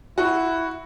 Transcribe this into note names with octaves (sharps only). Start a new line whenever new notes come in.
E4 F#4